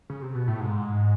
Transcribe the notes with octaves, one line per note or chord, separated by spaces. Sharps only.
C#3
C3
B2
A2
G#2